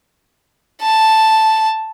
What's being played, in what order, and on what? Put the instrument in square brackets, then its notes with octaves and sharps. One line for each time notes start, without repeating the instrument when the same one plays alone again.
[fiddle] A5